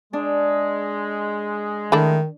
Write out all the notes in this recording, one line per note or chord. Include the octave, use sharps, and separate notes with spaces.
G#3 D4
D#3 A3 D4 E4